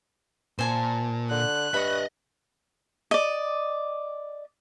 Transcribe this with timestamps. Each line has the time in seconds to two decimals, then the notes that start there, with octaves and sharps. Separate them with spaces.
0.59 A#2 C5 G#5 A5
1.31 D3 F#6
1.74 G2 D#5 E5 B5 C#6
3.11 D5 D#5